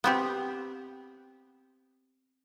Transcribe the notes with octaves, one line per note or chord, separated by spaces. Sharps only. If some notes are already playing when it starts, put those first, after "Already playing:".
B3 C4 G4